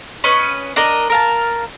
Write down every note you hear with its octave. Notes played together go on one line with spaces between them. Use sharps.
C#4 B4 D#5 C#6
D4 A#4 D#5
A#4 F5 A5